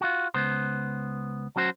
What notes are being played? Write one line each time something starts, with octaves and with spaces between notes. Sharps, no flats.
F4 F#4
C#2 B3 C5
F#3 C#4 F#4 C5